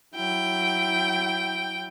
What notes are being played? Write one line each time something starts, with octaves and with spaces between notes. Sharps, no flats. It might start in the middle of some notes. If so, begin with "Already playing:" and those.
F#3 E4 G5